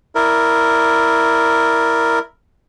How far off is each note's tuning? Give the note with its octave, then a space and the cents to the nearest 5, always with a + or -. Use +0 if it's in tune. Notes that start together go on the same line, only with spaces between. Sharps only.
E4 +0 A#4 +0 D5 +0